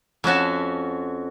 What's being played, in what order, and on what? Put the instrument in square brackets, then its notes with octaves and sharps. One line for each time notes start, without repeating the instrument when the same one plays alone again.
[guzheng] F2 C#4 F#4 A5